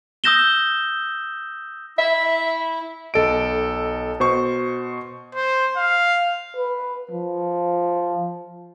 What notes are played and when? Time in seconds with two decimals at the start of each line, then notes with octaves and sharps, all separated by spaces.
0.24 D#6 E6 G6 A#6 E7 G7
1.98 E4 E5
3.14 B1 A4 D#5 D7
4.20 B2 C5 C#6
5.35 C5
5.77 F5
6.56 B4
7.11 F3